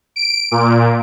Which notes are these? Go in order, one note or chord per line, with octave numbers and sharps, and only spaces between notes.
D7
A#2